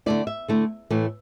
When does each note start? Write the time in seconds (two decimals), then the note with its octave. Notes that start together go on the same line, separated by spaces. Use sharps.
0.06 D3 A3 E4 D5
0.27 E5
0.48 D3 A3 E4
0.90 A2 E3 A3